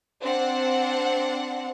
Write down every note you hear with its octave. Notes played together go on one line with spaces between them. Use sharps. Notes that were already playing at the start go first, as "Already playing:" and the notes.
C4 D4 F#5